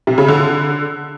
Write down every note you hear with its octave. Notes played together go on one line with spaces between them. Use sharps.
C3
C#3
D3